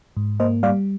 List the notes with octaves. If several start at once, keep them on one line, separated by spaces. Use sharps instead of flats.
G#2
A#3 C5 D#5
G3 D5 F5